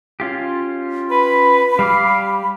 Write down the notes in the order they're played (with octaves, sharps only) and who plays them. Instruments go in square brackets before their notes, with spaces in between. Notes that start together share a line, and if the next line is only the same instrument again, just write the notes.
[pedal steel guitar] C#4 F4 G4
[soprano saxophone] B4 [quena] B5
[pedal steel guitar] G3 G4 D6 [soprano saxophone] F5